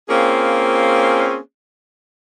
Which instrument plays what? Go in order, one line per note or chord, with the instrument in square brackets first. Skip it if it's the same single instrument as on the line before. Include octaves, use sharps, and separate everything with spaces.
[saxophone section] A#3 C4 C#4 F4 G#4